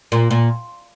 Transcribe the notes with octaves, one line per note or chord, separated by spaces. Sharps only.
A#2
A#2